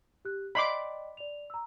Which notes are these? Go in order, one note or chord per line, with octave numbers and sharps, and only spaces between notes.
G4 F#6
D5 D#5 G5 B5 C6 D6
D5 F7
A#5 E6